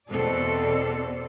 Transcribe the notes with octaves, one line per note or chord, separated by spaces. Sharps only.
E2 B2 C4 A4 D5